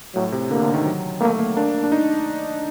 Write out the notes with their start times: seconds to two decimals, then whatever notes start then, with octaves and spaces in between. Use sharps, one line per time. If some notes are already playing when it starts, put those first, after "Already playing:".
0.15 A2 F#3
0.32 C3
0.50 D3 A#3
0.63 D3
0.74 D#3
0.85 F#3
1.21 A3 A#3
1.39 A#3
1.56 A#3 D4
1.84 D4
1.92 D#4